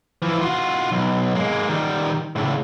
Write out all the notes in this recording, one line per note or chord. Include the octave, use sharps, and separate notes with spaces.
E3 F3
F4 F#4
B1
G#3 A#3
D#3 G3
A2 C#3